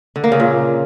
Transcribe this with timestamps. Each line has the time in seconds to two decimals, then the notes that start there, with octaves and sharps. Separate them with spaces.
0.16 D3
0.24 A#3
0.32 C#3
0.40 A#2